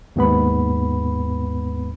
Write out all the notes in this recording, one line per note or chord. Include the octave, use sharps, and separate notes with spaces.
D#2 G#2 B3 B5